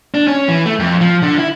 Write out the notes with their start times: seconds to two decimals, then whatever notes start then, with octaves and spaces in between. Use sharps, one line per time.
0.14 D4
0.27 C#4
0.48 E3
0.66 A3
0.79 F2
1.01 F3
1.22 D3
1.38 E4